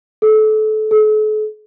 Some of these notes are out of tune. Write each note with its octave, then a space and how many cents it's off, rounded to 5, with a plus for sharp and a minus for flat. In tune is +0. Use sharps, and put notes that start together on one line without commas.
A4 -30
A4 -45